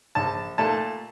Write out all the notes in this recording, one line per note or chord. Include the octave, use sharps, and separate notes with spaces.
A#1 A5
A#2 A3 A5